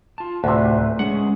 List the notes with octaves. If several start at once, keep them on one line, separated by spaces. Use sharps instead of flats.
F4 A5
D2 A2 C3 B4
G#3 C#4 G#4 F#5